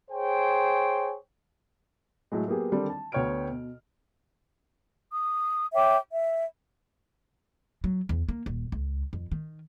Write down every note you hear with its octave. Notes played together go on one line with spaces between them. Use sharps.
G#4 C5 C#5 G5
A2 F#3 G#3
F#3 A#3 B3 G4 G#4
D3 D#3 G3 C4 D4 D#4
A5
D2 B3 C#5 G5 F6 D7
B2
D#6
C#5 E5 G5 D6
E5
F#3
E2
A#3
D#1
C#2
F2
D#3